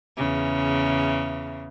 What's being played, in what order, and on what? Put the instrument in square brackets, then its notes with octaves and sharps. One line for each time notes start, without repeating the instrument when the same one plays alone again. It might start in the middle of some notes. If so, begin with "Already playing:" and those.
[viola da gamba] E2 C#3